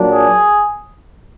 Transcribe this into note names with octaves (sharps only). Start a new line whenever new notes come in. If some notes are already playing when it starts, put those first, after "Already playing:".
Already playing: A#2 F#3 D4
G#4